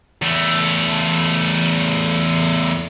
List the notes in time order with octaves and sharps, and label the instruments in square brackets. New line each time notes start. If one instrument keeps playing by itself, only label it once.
[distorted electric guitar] E2 A3